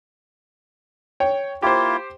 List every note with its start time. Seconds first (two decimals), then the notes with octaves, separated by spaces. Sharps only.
1.20 C#5 G5
1.62 A#3 E4 F4 G4 C5